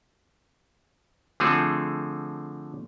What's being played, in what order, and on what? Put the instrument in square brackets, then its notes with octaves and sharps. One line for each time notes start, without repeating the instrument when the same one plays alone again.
[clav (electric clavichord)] D3 F3 A3 C4 G#4 A4